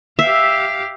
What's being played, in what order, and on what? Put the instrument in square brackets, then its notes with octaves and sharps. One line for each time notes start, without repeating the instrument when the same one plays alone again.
[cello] G4 F5 [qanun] E5